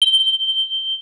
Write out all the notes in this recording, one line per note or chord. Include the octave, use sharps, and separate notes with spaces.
G7